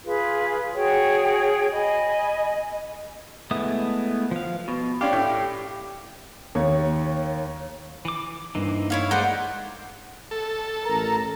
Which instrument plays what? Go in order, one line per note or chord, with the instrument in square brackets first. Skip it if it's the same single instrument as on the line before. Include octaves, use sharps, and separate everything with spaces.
[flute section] F4 G#4 B4
F#4 G#4 C#5 G5
D#5 G#5 B5
[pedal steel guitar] G#3 A3 B3 E4 D#6
F3 F5
[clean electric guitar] B2
[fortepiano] C#4 D4 F5 [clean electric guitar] G4
[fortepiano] A2
[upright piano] D#2 C#5
[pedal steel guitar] E3 D6
[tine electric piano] G2 D#4 [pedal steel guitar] E3 A#3 C4
[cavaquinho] E4 C#5 F5
[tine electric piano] G#3 [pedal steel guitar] D#4 E4 A#4 [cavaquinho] C5 D5 [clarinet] F#5
[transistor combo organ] A4
[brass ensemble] A1 A#4 A#5